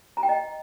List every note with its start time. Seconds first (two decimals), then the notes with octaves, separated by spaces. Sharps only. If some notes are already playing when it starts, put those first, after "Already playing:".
0.17 A#5
0.23 G5
0.29 D#5